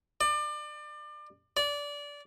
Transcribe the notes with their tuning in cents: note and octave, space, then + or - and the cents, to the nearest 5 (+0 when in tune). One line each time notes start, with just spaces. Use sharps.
D5 +30
D5 -20